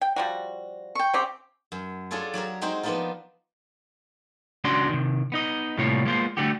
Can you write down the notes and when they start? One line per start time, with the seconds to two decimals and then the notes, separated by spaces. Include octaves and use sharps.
0.01 G5
0.16 F3 G3 F#4
0.95 G5 C#6
1.13 C#3 C4 G4
1.72 F#2
2.11 D4 F4 G#4 A4 C#5
2.34 F#3 F#4 G4 A#4
2.61 G#3 C4 D#4 F#4 C5 G5
2.83 F3 A#3 B3 D4 D#4 F4
4.64 C#2 C#4 D4 F#4 D5 C6
4.89 C3 D#3
5.32 B3 D#4 D#5
5.78 A2 C3 G3 A#3 F4 C#5
6.05 G#3 A#3 B3 F4 C5
6.37 D3 G3 A3 F#4 G4